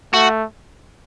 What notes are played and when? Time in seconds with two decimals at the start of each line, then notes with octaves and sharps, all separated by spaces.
0.13 A3 F#4